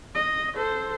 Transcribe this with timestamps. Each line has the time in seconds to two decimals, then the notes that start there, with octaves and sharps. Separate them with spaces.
0.15 D#5
0.56 A4 C5